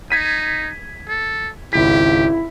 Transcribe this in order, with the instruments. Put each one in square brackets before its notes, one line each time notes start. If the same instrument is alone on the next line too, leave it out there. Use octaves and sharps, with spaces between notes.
[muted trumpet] D#4 [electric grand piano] G#6 B6 D#7
[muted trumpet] A4
[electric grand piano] G#1 C#2 B6 [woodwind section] E4 [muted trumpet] G4